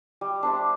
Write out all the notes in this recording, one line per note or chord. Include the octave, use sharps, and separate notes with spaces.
G3
D4 C5 E5